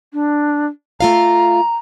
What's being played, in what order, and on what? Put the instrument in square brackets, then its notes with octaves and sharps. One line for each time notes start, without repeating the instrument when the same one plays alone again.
[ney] D4
[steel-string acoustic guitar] A3 F4 F5 [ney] A#5